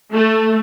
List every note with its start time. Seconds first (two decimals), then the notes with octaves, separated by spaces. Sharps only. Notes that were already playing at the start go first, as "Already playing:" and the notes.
0.13 A3